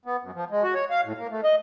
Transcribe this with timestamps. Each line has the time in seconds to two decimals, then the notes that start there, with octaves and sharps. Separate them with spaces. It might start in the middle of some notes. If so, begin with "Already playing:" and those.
0.05 B3
0.22 F#2
0.35 F3
0.50 G#3
0.63 F#4
0.74 C#5
0.90 F5
1.04 A2
1.18 A#3
1.30 A3
1.44 D#5